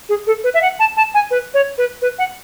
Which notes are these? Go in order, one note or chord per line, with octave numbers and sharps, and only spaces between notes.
G#4
A4
B4
E5
F#5
A5
A5
G#5
B4
C#5
B4
B4
F#5